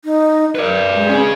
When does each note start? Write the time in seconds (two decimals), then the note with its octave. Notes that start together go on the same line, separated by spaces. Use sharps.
0.05 D#4
0.55 A#4 B4 D5
0.93 G#3
1.09 C#4 G#4